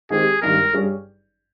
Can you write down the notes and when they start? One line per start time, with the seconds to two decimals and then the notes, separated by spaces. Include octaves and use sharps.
0.10 D#3 G#3 C4 G4 G#4
0.42 G#1 G2 D#3 G3 A#4
0.73 G2 G3 C#4 G#4